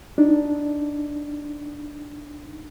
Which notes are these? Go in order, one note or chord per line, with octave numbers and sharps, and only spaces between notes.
D4 D#4